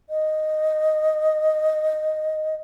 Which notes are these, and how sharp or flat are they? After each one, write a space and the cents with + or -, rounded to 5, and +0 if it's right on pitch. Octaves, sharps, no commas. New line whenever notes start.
D#5 -5